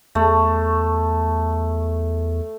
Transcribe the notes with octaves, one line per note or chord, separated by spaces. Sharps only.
E2 A3